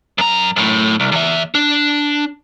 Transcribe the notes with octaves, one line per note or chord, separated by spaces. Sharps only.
F#2 A#5
F#2 A2
C2
E2 E5
D4